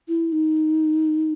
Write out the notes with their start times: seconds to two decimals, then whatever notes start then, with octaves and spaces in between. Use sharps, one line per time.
0.08 E4
0.32 D#4